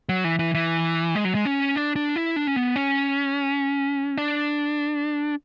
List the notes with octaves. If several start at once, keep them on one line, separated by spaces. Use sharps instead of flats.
F#3
E3
E3
E3
G#3
F#3
G#3
C#4
D4
D4
E4
D4
C#4
B3
C#4
D4